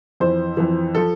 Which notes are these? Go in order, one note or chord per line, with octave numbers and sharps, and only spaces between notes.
F2 E3 C5
F2 E3
F3 A4